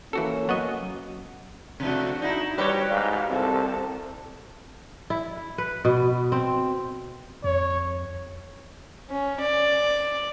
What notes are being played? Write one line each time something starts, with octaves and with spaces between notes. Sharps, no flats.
E3 A#3 C#4 F#4 A4
F#3 B3 F#4 D#5
C3 F3 A3 D4 F#4
D#4 E4
G3 F#4 G4 B4 C#5
G#2 F5
C2 C4 A4
E4
B4
B2
C4
F2 C#5
C#4
D5